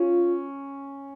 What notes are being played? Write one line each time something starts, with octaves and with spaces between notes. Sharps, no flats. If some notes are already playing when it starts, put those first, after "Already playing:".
Already playing: C#4 F4